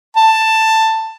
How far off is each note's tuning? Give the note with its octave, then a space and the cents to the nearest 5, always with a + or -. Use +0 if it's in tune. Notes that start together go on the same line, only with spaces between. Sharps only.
A5 +10